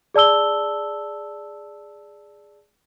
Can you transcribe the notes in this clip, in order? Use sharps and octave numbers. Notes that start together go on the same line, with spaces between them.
G#4 D5 A5 E6 G7